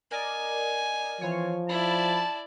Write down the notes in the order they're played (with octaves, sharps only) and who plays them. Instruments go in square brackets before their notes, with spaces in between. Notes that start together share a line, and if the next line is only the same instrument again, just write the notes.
[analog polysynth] A#4 D5 D#5 [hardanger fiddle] G#5
[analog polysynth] E3 C#5 [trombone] F3 [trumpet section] C4 F4
[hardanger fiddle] E4 D5 [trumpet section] A5 [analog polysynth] B5